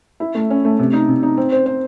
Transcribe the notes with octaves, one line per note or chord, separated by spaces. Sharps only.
E4
A3
C#4
A3
C3
D#4
C3
D#4
C4
C5
C5